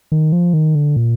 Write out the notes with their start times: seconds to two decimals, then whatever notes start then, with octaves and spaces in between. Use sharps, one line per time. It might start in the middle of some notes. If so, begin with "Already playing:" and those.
0.12 D#3
0.32 F3
0.54 D#3
0.75 D3
0.96 A#2